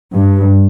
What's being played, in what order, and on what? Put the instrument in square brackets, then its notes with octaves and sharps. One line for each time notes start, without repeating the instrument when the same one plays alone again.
[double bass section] G2